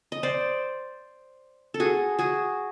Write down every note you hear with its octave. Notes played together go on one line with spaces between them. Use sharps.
D#5
C5 D5
A4
F#4 G#4
F#4 G#4